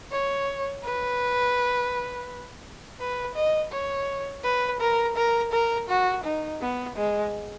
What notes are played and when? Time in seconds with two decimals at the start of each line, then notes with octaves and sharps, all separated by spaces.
0.12 C#5
0.83 B4
3.00 B4
3.35 D#5
3.72 C#5
4.44 B4
4.80 A#4
5.16 A#4
5.52 A#4
5.88 F#4
6.24 D#4
6.61 B3
6.96 G#3